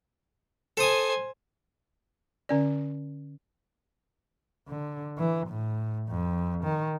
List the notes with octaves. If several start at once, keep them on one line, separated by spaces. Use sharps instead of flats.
A4 C5 G#5 D#6
D3 C#4 D5
D3
E3
A2
F2
D#3